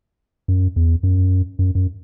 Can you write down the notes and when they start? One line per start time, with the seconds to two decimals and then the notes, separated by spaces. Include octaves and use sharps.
0.48 F#2
0.76 E2
1.03 F#2
1.59 F#2
1.75 F#2